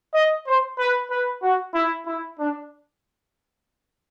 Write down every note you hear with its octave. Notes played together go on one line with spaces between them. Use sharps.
D#5
C5
B4
B4
F#4
E4
E4
D4